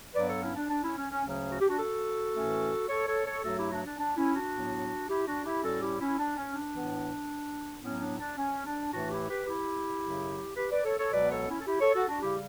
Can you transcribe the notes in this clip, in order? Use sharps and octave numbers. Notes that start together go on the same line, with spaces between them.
G2 F#3 B3 B4 D5
A4 C#5
C#4 E4
D4
D4
C#4 E4
C#4
C#4
D2 C#3 F#3 C#4
F#4
G4
D4 F#4
F#4 A4
A2 E3 A3 C#4
A4 C#5
A4 C#5
A4 C#5
G2 F#3 A3 F#4 A4
E4 G4
D4 F#4
D4
D4
C#4 E4
D4 F#4
A2 F#3 B3
E4 G4
D4 F#4
E4 G4
A2 G3 C#4 F#4 A4
E4 G4
C#4 E4
D4
C#4
D4
A2 E3 B3
A2 F#3 B3 C#4
D4
D4
C#4
D4
A2 E3 A3 D4 F#4
E4 G4
G4 B4
E4 G4
F#2 C#3 F#3
G4 B4
B4 D5
A4 C#5
A4 C#5
C#2 B2 F#3 B3 B4 D5
A4 C#5
C#4 E4
A4
E4 G4
A4 C#5
F#4 A4
D4 F#4
C#3 G3 E4 G4